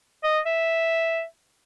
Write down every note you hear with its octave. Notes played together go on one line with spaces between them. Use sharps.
D#5
E5